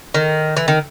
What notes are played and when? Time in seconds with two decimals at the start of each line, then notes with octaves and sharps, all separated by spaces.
0.14 D#3
0.57 E3
0.68 D#3